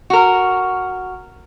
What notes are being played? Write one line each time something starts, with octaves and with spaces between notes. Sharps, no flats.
F#4 A#4